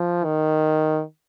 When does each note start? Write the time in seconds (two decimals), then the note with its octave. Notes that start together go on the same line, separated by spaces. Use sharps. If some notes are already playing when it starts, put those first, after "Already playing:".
Already playing: F3
0.24 D#3